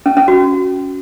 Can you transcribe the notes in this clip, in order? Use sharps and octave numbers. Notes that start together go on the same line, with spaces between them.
C#4
C#4
F#4